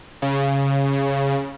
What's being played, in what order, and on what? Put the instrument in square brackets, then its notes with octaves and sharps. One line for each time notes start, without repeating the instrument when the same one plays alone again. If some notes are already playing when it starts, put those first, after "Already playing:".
[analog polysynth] C#3